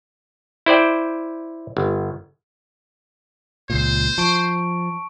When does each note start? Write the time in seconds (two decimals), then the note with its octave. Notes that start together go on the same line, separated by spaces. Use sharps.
0.66 E4 C5 D5 G5
1.77 G1
3.70 C#2 A#2 C5
4.18 F3 A5 C#6 D7